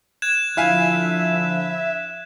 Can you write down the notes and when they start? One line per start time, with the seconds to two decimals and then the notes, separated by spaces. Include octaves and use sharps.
0.22 F#6 G#6 E7
0.57 D3 F3 E4 E5 F5 G#5